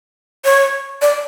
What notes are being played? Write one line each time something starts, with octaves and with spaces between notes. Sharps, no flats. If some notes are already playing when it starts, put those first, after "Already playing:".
C#5
D5